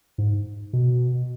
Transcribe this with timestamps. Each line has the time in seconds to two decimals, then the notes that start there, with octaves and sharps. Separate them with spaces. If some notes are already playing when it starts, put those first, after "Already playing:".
0.18 G#2
0.73 B2